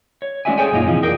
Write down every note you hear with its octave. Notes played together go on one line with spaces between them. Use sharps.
C#5
G#3 C#4 F#4 D5 E5 G#5
G#4 A4 C5 C#5 G5 G#5
F#2 A#2 G#3 D#4 F4
C3 E3 F3 G#3
F2 G#4 A#4 D5 G5